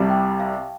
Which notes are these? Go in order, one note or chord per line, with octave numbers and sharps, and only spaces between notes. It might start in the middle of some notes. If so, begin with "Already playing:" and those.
Already playing: C2 C3 G3 F5 A5
G5
F5